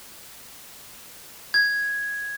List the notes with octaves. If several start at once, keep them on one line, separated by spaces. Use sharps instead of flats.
G#6